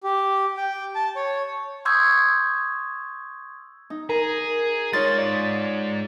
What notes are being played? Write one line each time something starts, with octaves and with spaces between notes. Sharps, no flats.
G4
G5
A5
C#5
C6 C#6 D#6 E6 G6 G#6
D#4
G#4 A#4 A#5
G#2 D#4 F4 C#5 C6 A6
D5